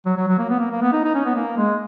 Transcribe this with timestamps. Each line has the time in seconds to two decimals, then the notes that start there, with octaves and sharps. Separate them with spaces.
0.06 F#3
0.17 F#3
0.28 F#3
0.38 A#3
0.50 B3
0.60 A#3
0.71 A#3
0.82 B3
0.92 D#4
1.04 D#4
1.15 C#4
1.25 B3
1.36 A#3
1.58 G#3